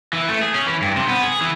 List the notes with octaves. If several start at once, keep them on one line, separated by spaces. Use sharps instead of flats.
E3
A3
G#4
C#4
E3
G2
C3
B3
G#4
E3